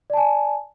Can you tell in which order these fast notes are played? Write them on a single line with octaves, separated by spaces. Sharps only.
D5 A5 G#5